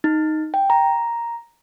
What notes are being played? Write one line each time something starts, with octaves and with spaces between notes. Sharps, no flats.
D#4
G5
A#5